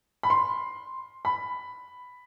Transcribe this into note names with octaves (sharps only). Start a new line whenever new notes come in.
B5
C6
B5